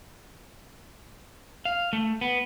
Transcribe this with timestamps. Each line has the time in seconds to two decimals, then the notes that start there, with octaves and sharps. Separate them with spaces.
1.65 F5
1.93 A3
2.21 B3